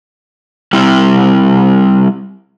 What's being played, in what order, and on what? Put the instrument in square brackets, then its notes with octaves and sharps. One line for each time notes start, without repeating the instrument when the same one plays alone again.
[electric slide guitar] G3 C4 E4